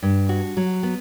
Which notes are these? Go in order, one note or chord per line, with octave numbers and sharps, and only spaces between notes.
G2
F#4
F#3
B3